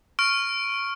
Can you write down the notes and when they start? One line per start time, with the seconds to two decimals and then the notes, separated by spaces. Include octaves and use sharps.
0.19 C#6 F6 D7